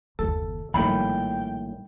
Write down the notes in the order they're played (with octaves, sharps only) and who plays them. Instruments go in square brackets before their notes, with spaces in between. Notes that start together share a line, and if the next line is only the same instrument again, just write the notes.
[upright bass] F#1 D#2 [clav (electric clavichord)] A4
[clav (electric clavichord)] A#1 A2 D#3 [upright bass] F#3 G3 [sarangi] G5 [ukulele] B5